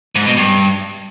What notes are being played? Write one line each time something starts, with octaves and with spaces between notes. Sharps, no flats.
G#2
B2
G2